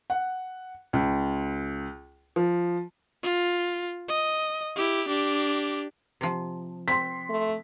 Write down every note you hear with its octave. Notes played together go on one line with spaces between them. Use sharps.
F#5
C#2
F3
F4
D#5
E4 G4
D4 G4
C3 F3
C4 C6 B6
A3